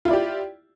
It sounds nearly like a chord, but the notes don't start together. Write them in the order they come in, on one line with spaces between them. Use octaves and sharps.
F4 E4 D5 G4